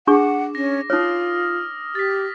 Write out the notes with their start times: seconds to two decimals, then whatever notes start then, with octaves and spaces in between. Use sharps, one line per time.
0.07 D4 G#4 F#5 C#6 D6
0.55 C#4 A#6
0.90 D#4 F4 C#5 D#6 F6
1.95 G4 A6 B6